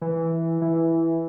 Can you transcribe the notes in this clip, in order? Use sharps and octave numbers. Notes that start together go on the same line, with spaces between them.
E3
E3